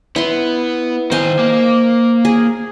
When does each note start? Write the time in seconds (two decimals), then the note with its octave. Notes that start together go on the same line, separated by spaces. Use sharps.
0.16 B3 E4 C6
1.12 D#3 C5 D#5 F5 G#5
1.39 A#3
2.25 G#4